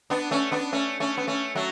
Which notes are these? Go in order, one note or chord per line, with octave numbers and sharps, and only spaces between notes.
B3 D4
A3 C#4
B3 D4
A3 C#4
A3 C#4
B3
A3 C#4
F#3 A3